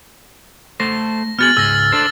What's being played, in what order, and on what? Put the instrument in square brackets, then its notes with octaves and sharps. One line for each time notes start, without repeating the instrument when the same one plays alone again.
[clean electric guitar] A3 A4 C5 [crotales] A#6
[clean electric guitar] B3 F#4 G#4 [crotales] F6 A6 F#7
[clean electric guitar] C#2 G#2 G#4 [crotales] E6 A#6
[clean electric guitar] D4 A4 C5 [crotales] A6